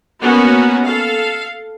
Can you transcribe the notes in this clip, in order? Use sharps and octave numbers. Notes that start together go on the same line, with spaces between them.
A#3 B3 C#4 F#4 A#4
A4 F5